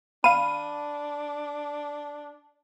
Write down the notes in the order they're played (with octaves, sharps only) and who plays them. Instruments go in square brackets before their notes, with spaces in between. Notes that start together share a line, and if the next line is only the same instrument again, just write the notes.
[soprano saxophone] D4 [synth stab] F5 D#7 [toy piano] B5